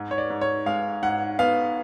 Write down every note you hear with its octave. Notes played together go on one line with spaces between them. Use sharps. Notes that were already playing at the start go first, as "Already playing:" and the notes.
Already playing: G#2
C#5
D5
G#2
C#5
G#3 F5
G#2 F#5
B3 F5